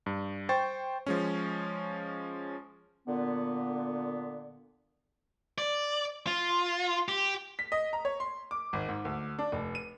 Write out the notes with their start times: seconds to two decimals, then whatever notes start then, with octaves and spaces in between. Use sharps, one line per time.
0.06 G2
0.49 C5 G5 C6 C#6 A6
1.06 F3 G#3 C#4
3.07 A#2 D3 B3
5.58 D5
6.27 F4
7.09 G4
7.59 B6
7.72 D#5
7.93 A#5
8.05 C#5
8.20 C6
8.51 D6
8.73 G#1
8.88 G#2
9.05 D2
9.39 D4
9.52 F1
9.75 D#7